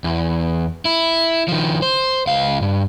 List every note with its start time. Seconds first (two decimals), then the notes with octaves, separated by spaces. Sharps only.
0.04 E2
0.85 E4
1.48 D#3 F3
1.82 C5
2.27 C#2 F5
2.62 G2